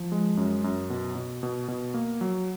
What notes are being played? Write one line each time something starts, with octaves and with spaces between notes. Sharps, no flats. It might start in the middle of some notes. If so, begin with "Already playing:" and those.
Already playing: F3
G#3
F#2
F#2
B2
B2
B2
B2
A#3
F#3